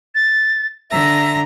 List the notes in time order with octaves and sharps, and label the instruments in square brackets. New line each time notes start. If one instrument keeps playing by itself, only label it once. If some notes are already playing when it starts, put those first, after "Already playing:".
[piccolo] A6
[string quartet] D3 A#5 A#6 [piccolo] E5